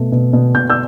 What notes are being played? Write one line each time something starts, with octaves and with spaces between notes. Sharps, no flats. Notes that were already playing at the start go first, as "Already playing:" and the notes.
Already playing: B2 A3
B2
B2
B2 G6
E6 G6